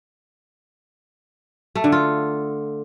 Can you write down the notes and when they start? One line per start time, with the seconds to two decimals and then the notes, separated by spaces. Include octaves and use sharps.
1.75 A3
1.84 D3
1.92 F4